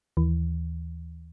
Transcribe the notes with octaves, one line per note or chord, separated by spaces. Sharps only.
D#2 E3